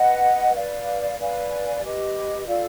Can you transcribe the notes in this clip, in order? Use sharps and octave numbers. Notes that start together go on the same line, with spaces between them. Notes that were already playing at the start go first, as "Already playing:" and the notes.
Already playing: B4 D#5 F#5
B4 D5 F5
B4 D5 F5 G#5
G4 B4 D#5
F4 A4 D5 F5